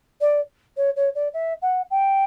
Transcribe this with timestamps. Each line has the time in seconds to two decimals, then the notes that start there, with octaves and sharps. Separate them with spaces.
0.20 D5
0.77 C#5
0.96 C#5
1.15 D5
1.33 E5
1.62 F#5
1.90 G5